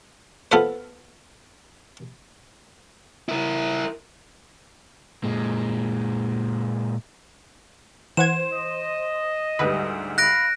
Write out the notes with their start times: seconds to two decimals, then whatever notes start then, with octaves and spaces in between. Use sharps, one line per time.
0.52 B3 F4 A4 B4 C5
3.29 E4 A#4
5.24 A#2 G#3
8.17 E3 C5 F#5 G#6 E7
8.51 D#5
9.59 D2 G#2 G3 B4
10.18 F5 B5 F#6 A#6 D7